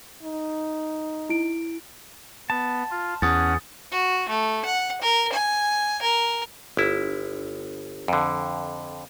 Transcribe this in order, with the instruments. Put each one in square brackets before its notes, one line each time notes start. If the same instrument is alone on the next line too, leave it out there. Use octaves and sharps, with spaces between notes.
[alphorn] D#4
[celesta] E4 D7
[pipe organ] B3 [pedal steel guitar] A5
[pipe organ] F4
[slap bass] E2 [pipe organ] C#4 F#5 [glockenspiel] D#6 A6
[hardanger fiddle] F#4
A3
F#5
A#4
G#5
A#4
[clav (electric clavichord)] G1 E4
F2 D3